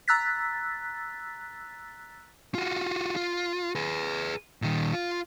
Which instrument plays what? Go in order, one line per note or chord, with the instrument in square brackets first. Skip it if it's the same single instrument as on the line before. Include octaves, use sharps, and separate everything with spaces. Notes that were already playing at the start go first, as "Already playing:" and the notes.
[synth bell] A#5 E6 F#6 A6 B6
[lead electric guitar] F4 F#4
F4
G#4 B4
A#2 D#3
F4